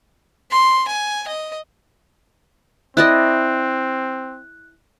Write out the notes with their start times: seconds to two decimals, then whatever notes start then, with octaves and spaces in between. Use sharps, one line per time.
0.51 C6
0.88 G#5
1.28 D#5
2.97 C4 E4 D5 D#5 F#6